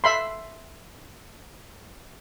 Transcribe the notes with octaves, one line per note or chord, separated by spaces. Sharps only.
E5 B5 C6